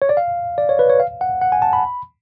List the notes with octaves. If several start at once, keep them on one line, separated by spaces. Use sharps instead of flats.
C#5
D5
F5
D5
C#5
B4
C#5
F5
F#5
F#5
G#5
A5
B5